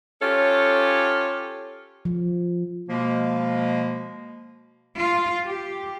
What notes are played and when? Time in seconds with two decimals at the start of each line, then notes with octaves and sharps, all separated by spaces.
0.21 C#4 F4 G4 A4 C#5
2.05 F3
2.89 B2 F3 G#3 A#3
4.98 F4
5.46 G4